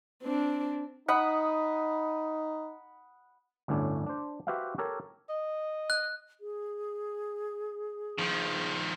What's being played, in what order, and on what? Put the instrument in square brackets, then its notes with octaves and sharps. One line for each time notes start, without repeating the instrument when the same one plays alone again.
[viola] C4 D4
[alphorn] D#4 [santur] F#5 B5 D#6
[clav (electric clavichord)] G1 D2 A2 C#4 D4
D4 C5
F#4 G4 B4 C5 E5 F5
G4 A4 A#4 C#5
[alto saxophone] D#5
[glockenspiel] F#6
[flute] G#4
[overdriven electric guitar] D#3 F3